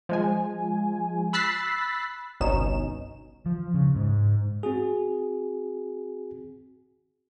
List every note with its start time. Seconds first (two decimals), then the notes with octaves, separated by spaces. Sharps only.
0.09 F3 G#3 G#5
1.33 B5 E6 F#6 A6 B6 C7
2.41 G1 C2 B2 C#4 D#4 E7
3.46 F3
3.74 C#3
3.96 G#2
4.63 C4 F#4 G#4